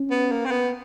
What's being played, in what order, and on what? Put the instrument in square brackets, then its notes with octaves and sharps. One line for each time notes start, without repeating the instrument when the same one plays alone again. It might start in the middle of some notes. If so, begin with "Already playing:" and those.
Already playing: [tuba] C#4
[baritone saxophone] B3
A#3
C4
B3